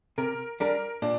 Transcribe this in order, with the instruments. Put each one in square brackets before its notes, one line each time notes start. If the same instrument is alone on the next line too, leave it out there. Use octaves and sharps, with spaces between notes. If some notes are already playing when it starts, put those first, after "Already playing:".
[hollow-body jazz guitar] C3 [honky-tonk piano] A#4
[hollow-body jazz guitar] G3 D4 [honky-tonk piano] A#4
[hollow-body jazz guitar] A#2 [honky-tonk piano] D4